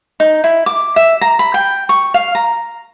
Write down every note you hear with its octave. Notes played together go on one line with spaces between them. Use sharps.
D#4
E4
D6
E5
A#5
B5
G5
C#6
F5
A#5